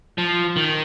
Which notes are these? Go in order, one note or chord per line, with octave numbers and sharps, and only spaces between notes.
F3
D#3